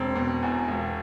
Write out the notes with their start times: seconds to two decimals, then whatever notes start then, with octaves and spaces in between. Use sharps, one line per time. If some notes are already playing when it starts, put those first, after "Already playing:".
Already playing: E1 C4
0.16 B2
0.43 E2
0.68 E1